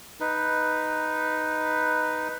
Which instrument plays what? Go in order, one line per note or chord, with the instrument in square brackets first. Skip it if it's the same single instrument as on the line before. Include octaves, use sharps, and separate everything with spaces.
[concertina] D#4 B4